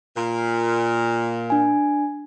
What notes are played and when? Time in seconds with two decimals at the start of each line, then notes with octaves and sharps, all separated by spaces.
0.15 A#2
1.50 D4 G#5